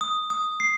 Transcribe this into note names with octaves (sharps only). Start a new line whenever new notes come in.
D#6
D#6
C7